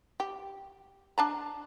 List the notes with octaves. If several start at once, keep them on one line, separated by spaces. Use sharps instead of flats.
G4
D4 A5 A#5